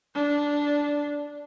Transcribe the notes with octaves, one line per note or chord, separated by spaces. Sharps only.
D4